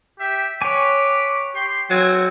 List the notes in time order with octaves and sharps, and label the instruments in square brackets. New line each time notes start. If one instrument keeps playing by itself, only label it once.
[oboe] G4 [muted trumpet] E5
[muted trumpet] B4 [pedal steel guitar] C#5 G5 G#5 [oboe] D6
[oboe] G4 [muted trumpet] C6
[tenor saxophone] F#3 [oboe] C4 [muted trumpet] G#5